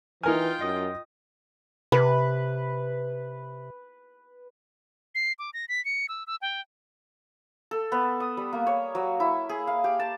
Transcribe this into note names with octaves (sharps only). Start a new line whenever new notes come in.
E3 D#4 F4 A#4 G5 G#5 F6
F#2 D#5 D#6
C3 B4
C7
D6
A#6
B6
C#7
E6
E6
G5
A4
B3
D#6
G3
A#3
C#5
F#3
E4
G#4
F5
G4
A5